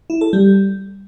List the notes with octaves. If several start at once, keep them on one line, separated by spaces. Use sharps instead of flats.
E4
A4
G3